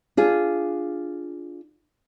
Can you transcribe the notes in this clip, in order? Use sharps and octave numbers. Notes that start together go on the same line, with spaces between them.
D4 F4 G#4